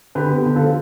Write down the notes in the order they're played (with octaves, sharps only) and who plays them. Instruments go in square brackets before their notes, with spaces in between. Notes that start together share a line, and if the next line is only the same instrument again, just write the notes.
[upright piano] D3 G4 B4
B3
D3
F4 A4
F3